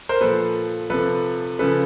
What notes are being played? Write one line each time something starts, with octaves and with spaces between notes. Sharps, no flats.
A#4 C5
A#2 F3 A4 B4
C3 F3 A4 B4
C#3 F3 A4 B4